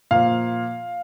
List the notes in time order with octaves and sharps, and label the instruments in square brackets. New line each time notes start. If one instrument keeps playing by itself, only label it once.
[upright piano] A#2 F3 F5